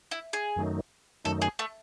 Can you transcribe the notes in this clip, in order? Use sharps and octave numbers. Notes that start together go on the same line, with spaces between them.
E4
G#4
F#2 D#3 F#3 A3 D#4
F#2 D#3 F#3 A3 D#4 A4
G#4
A3